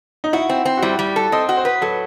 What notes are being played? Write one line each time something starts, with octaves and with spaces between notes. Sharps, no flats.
D#4
E4 F#4
C4
C4
F#4
G3 E4
G3
A4
C4 D#5
F#4
C5
B4
F#3 A4